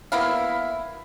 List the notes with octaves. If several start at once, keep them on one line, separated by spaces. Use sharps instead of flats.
A#3 B3 E4 F5